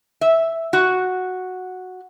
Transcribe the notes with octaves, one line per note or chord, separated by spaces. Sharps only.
E5
F#4